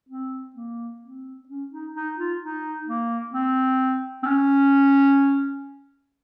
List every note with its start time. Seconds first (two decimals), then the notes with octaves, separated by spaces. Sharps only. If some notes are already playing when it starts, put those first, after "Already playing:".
0.09 C4
0.55 A#3
1.02 C4
1.48 C#4
1.71 D#4
1.94 D#4
2.17 F4
2.41 D#4
2.87 A#3
3.33 C4
4.23 C4
4.26 C#4